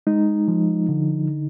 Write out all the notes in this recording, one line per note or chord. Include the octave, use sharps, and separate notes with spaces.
G#3 D#4
F3
D3